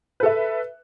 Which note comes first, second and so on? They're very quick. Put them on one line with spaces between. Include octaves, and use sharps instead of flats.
B4 A4 E5